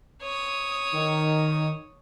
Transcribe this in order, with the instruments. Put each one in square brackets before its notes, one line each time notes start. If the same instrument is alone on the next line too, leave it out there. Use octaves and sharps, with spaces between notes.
[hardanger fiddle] C#5 D#6
[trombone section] D#3